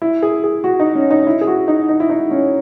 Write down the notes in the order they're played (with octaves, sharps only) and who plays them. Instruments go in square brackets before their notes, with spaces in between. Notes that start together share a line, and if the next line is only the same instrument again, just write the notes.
[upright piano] E4
G#4
G#4
F#4
D#4
C#4
D#4
E4
G#4
F#4
D#4
D#4
E4
D#4
C#4